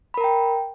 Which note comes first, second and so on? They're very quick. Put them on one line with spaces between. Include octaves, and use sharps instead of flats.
B5 A#4 A#5 G5